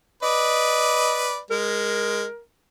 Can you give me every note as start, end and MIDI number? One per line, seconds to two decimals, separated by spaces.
0.23 1.39 71
0.23 1.39 74
0.23 1.29 75
1.50 2.25 56
1.50 2.41 70